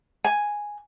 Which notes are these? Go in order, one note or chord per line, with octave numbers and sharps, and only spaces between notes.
G#5